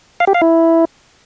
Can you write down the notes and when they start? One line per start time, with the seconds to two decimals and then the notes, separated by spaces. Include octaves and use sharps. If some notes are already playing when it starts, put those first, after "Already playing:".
0.20 F5
0.27 G4
0.34 F5
0.42 E4